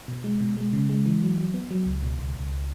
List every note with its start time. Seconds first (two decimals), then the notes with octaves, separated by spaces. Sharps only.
0.08 B2
0.24 G#3
0.40 B2
0.57 G#3
0.73 C#3
0.89 G#3
1.06 E3
1.22 F#3
1.38 F#3
1.54 B3
1.71 F#3
1.86 C#2
2.03 B2
2.19 C#2
2.35 C#2